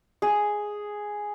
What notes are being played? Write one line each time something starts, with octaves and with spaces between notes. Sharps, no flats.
G#4